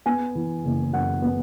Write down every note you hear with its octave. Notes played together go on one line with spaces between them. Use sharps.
B3 G#5
E3
F#1
F#2 F#5
B3